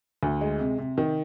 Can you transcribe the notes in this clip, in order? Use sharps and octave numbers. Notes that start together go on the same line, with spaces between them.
D2
G#3
C3
C3
D#3